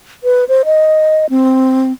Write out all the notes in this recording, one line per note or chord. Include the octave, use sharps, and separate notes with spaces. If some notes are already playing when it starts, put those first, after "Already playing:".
B4
C5
D#5
C4